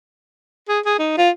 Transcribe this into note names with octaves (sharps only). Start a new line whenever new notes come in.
G#4
G#4
D#4
F4